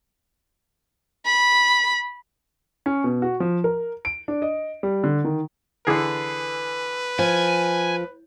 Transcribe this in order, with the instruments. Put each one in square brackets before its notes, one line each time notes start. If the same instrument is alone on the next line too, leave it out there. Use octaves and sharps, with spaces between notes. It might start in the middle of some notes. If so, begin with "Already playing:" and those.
[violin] B5
[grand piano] C#4
B2
F#4
F3
A#4
D7
D4
D#5
G3
D3
D#3
[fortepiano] D3 E3 G#4 [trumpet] B4
[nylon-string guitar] F3 [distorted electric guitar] G#5